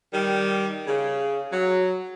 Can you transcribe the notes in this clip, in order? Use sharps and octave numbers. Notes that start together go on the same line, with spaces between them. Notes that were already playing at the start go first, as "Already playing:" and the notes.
D#3 G3
C#3
F#3